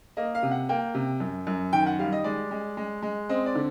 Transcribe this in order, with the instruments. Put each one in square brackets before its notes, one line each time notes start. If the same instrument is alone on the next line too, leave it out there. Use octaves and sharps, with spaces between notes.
[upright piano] A#3 D#5
F5
C3
F#5
A#3 G5
C3
F#2
F#2
D#3 G5
F#5
G3 F5
D#5
G#3 D5
G#3
G#3
G#3
C4 D#5
D5
D3